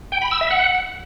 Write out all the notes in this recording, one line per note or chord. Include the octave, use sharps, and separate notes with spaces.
G5
B5
E6
E5
F#5